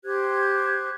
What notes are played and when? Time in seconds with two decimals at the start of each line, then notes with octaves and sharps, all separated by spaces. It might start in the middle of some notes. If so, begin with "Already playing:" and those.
0.04 G4 C5 F#6 G#6